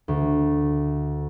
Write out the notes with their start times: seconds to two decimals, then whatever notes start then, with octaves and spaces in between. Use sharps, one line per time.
0.08 D2